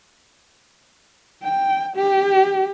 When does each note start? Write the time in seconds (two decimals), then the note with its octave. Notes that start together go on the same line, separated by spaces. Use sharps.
1.44 G5
1.96 G4